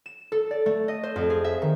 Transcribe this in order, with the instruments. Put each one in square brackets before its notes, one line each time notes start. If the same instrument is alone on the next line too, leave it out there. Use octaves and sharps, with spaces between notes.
[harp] E7
A4
D5
A3
D#5
C5
F2
G#4
E5
D#3